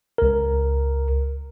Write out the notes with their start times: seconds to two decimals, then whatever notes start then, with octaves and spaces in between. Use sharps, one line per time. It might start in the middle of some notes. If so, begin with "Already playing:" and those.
0.18 C#2 A#4